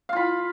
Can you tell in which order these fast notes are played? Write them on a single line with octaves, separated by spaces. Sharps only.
F5 F4 B5